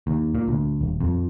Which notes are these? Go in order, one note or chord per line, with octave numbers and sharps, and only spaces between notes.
D#2
A#2
D2
D#1
F2